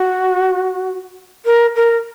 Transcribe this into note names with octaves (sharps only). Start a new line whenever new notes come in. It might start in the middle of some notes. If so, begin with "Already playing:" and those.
Already playing: F#4
A#4
A#4